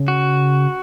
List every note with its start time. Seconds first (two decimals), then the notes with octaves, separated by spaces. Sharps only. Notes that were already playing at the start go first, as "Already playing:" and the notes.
Already playing: C#3
0.08 F#4